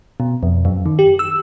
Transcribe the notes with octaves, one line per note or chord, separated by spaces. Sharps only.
B2
F2
F#2
D#3
G4
E6